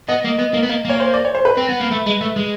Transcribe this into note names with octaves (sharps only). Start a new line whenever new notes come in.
B3 D#5
A#3
B3
A#3
B3
A#3
A#3 C#5
C5
D5
C#5
C5
B4
C4
B3
A#3
A3
G#3
A3
G#3